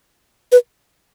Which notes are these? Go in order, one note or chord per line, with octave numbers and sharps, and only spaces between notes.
B4